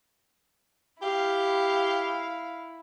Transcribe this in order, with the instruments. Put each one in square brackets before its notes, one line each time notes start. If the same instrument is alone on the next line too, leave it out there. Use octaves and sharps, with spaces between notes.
[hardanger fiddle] E4 [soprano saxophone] G4 [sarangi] F5